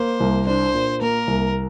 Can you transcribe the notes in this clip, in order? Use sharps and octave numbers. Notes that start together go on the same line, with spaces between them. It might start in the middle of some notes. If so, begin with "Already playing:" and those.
Already playing: A#3 C5
C2
D4 C5
A#2
A#3 A#4
C2